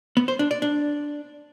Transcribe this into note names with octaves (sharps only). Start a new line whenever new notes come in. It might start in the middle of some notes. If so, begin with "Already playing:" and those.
B3
C5
D4
D5
D4